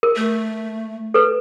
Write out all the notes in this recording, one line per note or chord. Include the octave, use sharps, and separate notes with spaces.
A#4
A3
A4 B4